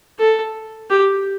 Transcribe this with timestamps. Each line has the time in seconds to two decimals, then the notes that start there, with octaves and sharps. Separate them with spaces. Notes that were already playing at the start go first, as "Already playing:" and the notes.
0.19 A4
0.90 G4